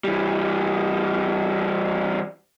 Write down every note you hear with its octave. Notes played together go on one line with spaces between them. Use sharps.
E3 G3